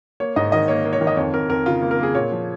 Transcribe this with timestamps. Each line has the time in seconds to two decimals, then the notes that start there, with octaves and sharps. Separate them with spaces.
0.20 A#3 C#5
0.36 G#2 D#5
0.52 D#3 D#5
0.68 A#3 C#5
0.85 A#3
0.93 C#5
1.01 D#3
1.07 D#5
1.17 F2 C#5
1.34 F2 A#4
1.49 F2 A#4
1.66 C#3 F4
1.82 A#3
1.91 A#4
1.99 A#3 G#4
2.15 A#2 C#5
2.32 F3